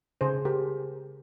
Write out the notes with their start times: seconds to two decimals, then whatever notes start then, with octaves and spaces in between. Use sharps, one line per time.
0.21 C#3 G#4 C5
0.45 G4 A#4